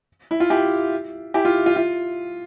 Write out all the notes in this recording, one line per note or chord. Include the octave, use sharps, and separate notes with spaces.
E4
F4
E4 G4
E4 G4
F4
F4
F4